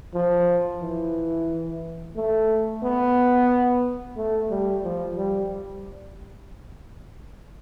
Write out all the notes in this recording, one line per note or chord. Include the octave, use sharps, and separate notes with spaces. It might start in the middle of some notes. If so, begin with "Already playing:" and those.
F3
E3
A3
B3
A3
G3
F3
G3